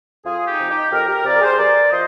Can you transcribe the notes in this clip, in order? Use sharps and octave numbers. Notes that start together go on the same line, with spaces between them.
F2 F4 G#4
D#4 G4
C3 F3
D#4 G4
F2 G4 A#4
G4 A#4
C3 F3 A#4 D5
A#4
G#4 C5
G2 A#4 D5
F3 C5 D#5